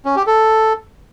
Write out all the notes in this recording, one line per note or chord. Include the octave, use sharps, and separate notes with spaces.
C#4
G4
A4